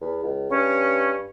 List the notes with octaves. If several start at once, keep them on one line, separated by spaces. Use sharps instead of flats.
E2
C#2
G2 C#4